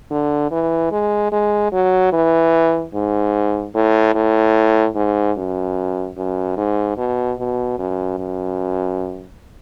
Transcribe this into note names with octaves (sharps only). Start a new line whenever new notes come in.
D3
E3
G#3
G#3
F#3
E3
G#2
A2
A2
G#2
F#2
F#2
G#2
B2
B2
F#2
F#2